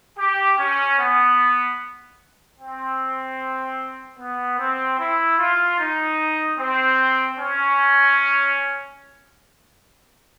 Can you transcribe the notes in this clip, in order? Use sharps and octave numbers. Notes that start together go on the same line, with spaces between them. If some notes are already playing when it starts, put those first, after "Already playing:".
G4
C#4
B3
C4
B3
C4
E4
F4
D#4
C4
C#4